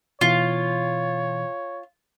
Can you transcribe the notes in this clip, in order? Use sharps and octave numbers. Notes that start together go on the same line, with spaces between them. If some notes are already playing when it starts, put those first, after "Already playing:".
B2 E3 F4 C#5